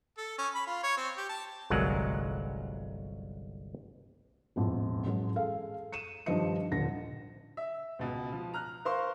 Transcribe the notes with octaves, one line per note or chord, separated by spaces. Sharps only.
A4
C#4
B5
F4
C#5
C4
G4
A5
G1 C2 F#3 G#3 A#4 F#5
E1 A1 F2
A1 F#3 G#3 G#4
G#4 A4 F5
C#7 D#7 E7
G2 D#3 F3 C5 D#5 C#7
D#1 A#1 D3 A#6
E5
C#2 B2
F3
A#5 F6 F#6
A#4 C5 F5 C6 C#6